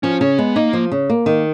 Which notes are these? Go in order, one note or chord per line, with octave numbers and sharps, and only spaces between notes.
F3 C#4
C#3 C#4
G#3 B3
A#3 D#4
F3
C#3
A#3
D#3